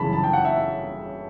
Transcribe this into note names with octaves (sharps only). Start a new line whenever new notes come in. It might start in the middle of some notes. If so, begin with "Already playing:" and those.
Already playing: G1 F#2 C#3 E3 A5 B5
A5
G5
F#5
E5